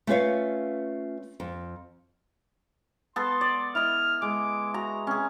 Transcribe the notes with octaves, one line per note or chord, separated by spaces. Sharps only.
A3 C#4 F4 B4 C#5 F5
F2
B3 A4 C6
D5
E4 D#5 F6
G#3 D6
F#4 A#5
C4 C#4 G#4